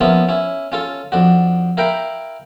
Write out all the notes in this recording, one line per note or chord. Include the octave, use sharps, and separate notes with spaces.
F3 A#3 B3 C#4 E4 F4
C#4 E4
C#4 F4 A4
F2 D4 F#4
E4 A#4 F5 G5 B5